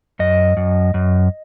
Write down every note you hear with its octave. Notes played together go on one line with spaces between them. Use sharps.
F#2 D#5
F#2
F#2